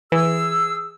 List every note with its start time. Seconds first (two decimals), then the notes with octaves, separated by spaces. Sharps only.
0.12 E3 G#4 E6